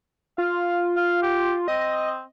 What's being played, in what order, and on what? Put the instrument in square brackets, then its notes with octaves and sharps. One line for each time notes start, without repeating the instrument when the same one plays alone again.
[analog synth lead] F4 [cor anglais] F5
[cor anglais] F5
G4
[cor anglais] C4 [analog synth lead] D#5